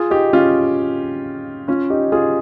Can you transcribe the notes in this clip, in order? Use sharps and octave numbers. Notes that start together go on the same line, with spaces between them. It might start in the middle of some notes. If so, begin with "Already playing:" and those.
Already playing: F4 G#4
D#4 G4
C#4 F4
C#4 F4
D#4 G4
F4 G#4